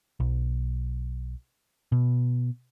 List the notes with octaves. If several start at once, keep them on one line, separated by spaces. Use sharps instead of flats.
B1
B2